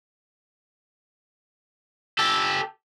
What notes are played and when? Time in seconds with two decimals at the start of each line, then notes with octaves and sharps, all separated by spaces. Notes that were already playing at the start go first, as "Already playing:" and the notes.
2.19 G4 A4